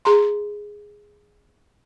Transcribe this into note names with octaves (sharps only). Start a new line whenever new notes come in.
G#4 A#5 C6